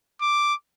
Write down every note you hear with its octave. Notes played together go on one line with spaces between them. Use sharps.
D6